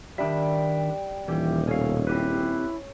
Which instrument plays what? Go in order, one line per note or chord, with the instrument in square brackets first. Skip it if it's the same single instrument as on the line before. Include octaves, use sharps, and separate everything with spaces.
[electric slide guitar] D#3 D4 E5 [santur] G3 [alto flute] G5
[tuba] D#1 [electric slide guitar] E3 G4
[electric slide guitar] B2 F5 [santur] C#4 G#5 [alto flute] A4
[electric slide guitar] C4 G4 B4 [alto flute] E4